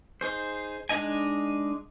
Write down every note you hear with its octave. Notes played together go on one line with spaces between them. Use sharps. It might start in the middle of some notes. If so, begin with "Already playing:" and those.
D#4 G#4 C5
G#3 D4 D#4 D#5 G#5